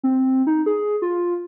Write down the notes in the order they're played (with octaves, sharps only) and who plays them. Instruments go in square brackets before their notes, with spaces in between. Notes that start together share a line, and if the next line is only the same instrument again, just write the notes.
[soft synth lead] C4
D#4
G#4
F4